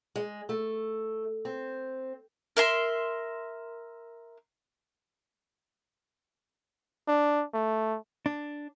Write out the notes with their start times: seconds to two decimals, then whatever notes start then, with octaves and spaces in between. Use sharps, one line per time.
0.16 G#3
0.49 A3
1.45 C4
2.57 A#4 E5 C6
7.08 D4
7.54 A3
8.26 D4